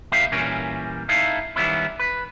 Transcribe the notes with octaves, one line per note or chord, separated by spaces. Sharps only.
C2 B3 D#4 G4 E5 F5
A#2 E3 G3 C#4 A#4
D#4 E4 A4 F5
D#3 G3 B3 C#4 E4
B4